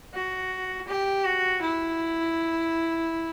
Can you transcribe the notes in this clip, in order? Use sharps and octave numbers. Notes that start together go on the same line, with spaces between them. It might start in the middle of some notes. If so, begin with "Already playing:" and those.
F#4
G4
F#4
E4